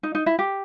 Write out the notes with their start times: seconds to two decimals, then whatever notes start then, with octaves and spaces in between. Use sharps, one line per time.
0.03 D#4
0.15 D#4
0.26 E4
0.39 G4